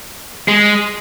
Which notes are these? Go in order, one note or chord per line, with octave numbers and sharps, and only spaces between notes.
G#3